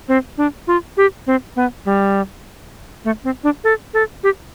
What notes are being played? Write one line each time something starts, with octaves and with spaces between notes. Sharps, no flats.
C4
D4
F4
G4
C4
B3
G3
A3
C4
D4
A4
A4
G4